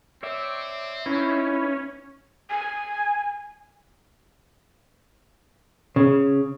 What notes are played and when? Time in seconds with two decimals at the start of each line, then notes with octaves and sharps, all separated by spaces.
0.23 C4 C#5 D5 E5
1.06 C#4 D#4 E4 B4
2.50 G#5
5.96 C#3